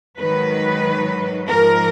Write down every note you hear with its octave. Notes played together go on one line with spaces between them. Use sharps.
G#2 D#3 F#3 B4
G#2 F3 A#4